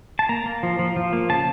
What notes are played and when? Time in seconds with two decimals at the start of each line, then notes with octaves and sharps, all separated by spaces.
0.19 A5
0.29 A#3 A#5
0.46 A#3
0.63 F3
0.79 F3
0.96 F3
1.13 A#3
1.30 C#3 A5